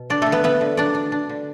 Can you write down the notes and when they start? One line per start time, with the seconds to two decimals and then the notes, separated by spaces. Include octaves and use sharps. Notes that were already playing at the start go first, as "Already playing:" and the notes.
Already playing: B2
0.10 D3 D4 D5
0.22 D3 A3 A4
0.32 B3 B4
0.43 A3 B3 B4
0.61 D3
0.77 F#3 D4 D5
0.95 D4
1.12 D4
1.29 D3